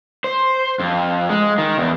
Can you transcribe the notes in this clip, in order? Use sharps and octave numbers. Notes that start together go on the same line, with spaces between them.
C5
F2
G#3
D#3
E2